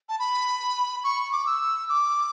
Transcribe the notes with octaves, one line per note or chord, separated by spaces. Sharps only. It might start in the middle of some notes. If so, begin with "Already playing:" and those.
A5
B5
C#6
D6
E6
D6